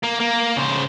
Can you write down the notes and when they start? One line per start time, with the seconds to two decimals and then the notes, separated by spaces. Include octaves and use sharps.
0.04 A#3
0.20 A#3
0.56 C#3 C5